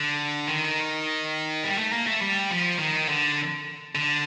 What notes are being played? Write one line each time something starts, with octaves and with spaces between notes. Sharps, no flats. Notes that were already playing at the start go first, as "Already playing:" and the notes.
Already playing: D3
D#3
G3
A3
A#3
A3
G3
F3
D#3
D3
D3